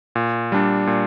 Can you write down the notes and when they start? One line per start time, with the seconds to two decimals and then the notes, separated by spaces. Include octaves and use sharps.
0.16 A#2
0.52 G3 D4
0.87 A#2